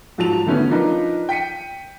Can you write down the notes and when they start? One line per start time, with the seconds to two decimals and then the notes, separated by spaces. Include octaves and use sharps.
0.18 G#2 F3 F#3 A5 F7
0.46 D3 D#3 F#3 A3 B3 C#4
0.70 F3 D4 D#4 A#4 B4
1.29 G5 B6 C#7 D#7